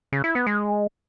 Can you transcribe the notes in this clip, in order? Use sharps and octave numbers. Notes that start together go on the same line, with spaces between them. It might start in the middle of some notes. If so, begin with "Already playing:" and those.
C#3
E4
B3
G#3